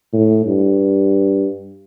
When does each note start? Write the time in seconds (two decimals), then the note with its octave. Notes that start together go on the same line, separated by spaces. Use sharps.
0.13 A2
0.46 G2